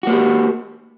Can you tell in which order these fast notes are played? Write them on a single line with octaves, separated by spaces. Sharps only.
F#4 A#3 G4